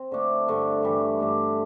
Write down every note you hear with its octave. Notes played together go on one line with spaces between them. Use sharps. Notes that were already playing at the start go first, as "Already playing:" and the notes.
Already playing: C4
D3 A3 D4
G2 D3 A3 D4
G2 E3 G3
G2 D3 A3 D4